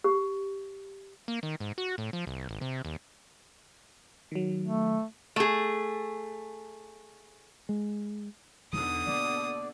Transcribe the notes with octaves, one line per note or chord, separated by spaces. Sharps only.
G4
A#3
D#3
G#2
F#4
A2
F3
C2
G#1
C3
D#2
D#3 F#3
A3
A3 G#4
G#3
E2 B2 D3 D#4 D#6
A#3 D5